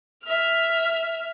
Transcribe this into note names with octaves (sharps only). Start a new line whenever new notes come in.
E5 F6